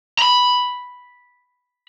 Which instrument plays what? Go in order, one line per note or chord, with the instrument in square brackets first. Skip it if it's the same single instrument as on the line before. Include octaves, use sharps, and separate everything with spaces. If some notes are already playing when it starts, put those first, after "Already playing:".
[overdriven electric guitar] A#5 B5